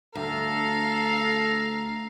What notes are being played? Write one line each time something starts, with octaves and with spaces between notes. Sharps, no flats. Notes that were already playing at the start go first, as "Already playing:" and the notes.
D2 A4 F5 A#5